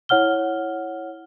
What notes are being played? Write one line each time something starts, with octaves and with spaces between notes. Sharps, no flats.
E4 C#5 F#5 F6 G7